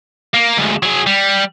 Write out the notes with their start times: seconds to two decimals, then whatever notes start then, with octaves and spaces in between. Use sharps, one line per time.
0.34 A#3
0.57 D2 G#2
0.83 F#3 G#4
1.06 G3